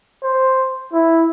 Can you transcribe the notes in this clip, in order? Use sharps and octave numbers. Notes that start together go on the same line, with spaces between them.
C5
E4